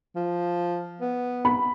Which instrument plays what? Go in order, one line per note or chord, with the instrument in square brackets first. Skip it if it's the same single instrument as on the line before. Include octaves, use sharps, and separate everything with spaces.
[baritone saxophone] F3
B3
[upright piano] B5